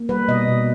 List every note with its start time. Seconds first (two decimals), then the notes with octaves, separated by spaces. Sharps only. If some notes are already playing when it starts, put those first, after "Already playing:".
Already playing: A#3
0.09 G3 B4
0.28 B2 D#5
0.48 B2